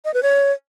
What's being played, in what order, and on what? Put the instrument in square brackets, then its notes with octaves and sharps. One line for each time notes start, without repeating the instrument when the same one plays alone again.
[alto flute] D#5
B4
C#5